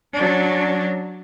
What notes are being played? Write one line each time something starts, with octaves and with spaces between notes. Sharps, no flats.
F#3 C#4 D4